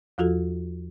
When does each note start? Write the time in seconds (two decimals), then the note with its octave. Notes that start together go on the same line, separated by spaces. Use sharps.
0.18 E2 F3 F4 F#4 A4